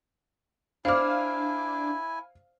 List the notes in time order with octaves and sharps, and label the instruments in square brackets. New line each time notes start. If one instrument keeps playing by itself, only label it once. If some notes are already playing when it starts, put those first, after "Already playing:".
[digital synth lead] D4 [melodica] E4 G#5 [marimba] C5 D5 D6 [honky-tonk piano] F5 F6